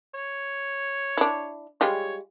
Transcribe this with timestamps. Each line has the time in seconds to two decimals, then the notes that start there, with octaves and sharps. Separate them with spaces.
0.14 C#5
1.17 D4 E4
1.81 G3 G#3 F4 C#5